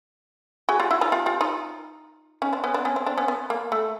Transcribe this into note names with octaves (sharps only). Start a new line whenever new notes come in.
F#4 G#4
F4 G4
E4 F#4
D#4 F4
F4 G4
F4 G4
D#4 F4
C#4 D#4
C4 D4
B3 C#4
C4 D4
B3 C#4
C4
C4 D4
B3 C#4
B3
A#3
A3